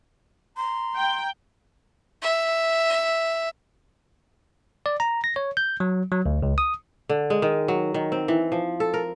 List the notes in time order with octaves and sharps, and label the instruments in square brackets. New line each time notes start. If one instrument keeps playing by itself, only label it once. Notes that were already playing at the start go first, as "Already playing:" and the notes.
[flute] A#5 [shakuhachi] C6
[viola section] G5
[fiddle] E5
[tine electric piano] D5
A#5
A#6
C#5
G6
F#3
F#3
D2
C#2
D#6
[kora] D3
G#3
D#3
F#3
D#3
C4
E3
F3
A4
A#4